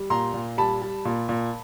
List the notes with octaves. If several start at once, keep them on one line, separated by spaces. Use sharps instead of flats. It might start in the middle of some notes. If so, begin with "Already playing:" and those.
Already playing: G3
A#2 A#5 C6
A#2
G3 A5 B5
G3
A#2
A#2